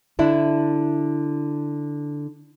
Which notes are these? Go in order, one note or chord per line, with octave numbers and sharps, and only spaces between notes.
D3 D4 E4